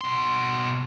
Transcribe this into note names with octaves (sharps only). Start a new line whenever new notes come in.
B2 C6